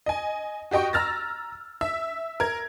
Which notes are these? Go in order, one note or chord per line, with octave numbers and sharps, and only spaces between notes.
D#5 G#5
F#4 G4 D#5 G5 C#6
A#5 E6 F6 A6 A#6
E5 E6 B6
A#4 G#6